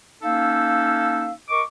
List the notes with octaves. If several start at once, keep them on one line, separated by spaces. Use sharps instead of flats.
A#3 C#4 D#4 A4 E5 F5
A#4 D#5 C#6 D6